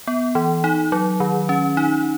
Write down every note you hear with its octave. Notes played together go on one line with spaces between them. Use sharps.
B3
E3
D#4
F#3
D#3
C#4
D#4